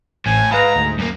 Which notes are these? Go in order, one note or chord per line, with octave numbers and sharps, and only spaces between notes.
A1 A2 G#5
G#2 B4 F5 A#5 B5
D2
F#2 A#3